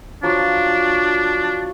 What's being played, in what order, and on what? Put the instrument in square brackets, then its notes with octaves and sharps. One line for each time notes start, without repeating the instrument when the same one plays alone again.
[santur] F3 F#3 C#5 [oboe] D4